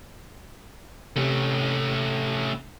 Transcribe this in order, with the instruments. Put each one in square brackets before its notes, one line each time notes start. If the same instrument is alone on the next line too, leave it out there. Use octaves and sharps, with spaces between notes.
[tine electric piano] C3 [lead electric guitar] A3 C#4